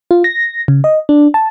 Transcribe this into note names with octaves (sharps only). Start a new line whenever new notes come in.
F4
A#6
C#3
D#5
D4
A5